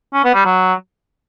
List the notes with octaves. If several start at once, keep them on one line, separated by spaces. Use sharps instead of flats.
C#4
B3
G3
F#3